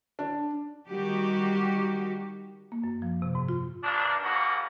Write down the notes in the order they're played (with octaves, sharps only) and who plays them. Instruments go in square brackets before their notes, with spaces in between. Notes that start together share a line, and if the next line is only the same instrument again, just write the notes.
[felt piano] D4
[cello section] D#3 G3 F#4 G4
[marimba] A#3
F#2
F3
C3
G#2
F4
[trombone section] G#1 G2 A#3 D4
D#2 G#2 F3 G3 A#3 F#4